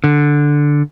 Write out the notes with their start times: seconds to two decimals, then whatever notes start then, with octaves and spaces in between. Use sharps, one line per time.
0.04 D3